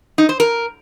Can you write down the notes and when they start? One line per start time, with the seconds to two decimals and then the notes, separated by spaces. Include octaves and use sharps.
0.18 D#4
0.29 C5
0.40 A#4